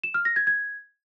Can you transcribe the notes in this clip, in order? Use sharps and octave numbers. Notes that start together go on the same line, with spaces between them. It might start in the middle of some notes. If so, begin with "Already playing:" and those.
E7
F6
A#6
G#6
G#6